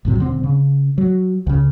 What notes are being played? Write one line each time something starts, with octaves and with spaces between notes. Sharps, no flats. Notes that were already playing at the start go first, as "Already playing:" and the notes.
A1 F#2 C3 F#3
D#1 D3 C4
C#3
F#3
C#2 C#3